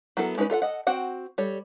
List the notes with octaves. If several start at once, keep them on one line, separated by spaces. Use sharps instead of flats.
F#3 B3 E4 A4 A#4
G#3 C#4 D#4 B4
F4 A4 E5 F#5
A4 D#5 F#5
C4 F#4 F#5 G5
G3 A4 C#5